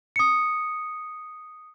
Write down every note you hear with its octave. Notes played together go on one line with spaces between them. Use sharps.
D#6 C#7